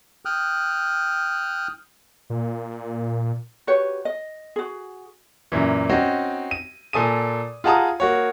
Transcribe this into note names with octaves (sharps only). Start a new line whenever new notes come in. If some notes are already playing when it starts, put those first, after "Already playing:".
G5 D#6 F6 F#6
A#2
F#4 G4 B4 C#5
D#5
F#4 G#4
F#2 A#2 E3
C4 C#4 D#4 F#4
D#7
A#2 A4 G#5 D#6 D#7
F4 G#4 F#5 A5 A#5 D#6
A#3 F#4 C#5